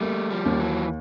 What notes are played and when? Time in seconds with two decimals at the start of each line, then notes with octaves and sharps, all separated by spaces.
0.01 G3 A3 A#3
0.30 F3 G3
0.46 D#2 F3
0.59 E3 F#3